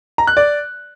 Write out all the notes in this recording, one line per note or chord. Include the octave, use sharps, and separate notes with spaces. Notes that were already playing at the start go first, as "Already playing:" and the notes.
A#5
F#6
D5